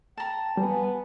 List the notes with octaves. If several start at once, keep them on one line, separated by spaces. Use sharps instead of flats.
G5 A5 A#5
G3 B3 G#5